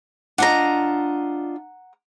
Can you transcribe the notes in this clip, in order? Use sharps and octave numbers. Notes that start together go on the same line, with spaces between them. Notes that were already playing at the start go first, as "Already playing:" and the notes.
D4 F4 D#5 F#5 A#5